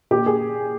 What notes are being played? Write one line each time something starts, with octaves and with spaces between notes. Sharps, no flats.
A#2 G4
G#4